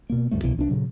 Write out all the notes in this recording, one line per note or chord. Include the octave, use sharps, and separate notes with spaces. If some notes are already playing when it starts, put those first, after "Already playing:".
B2 A#3
D2 G2 G3 A3
C2 B2 E3
C2 C#4 D4
A#2 C#3 F#3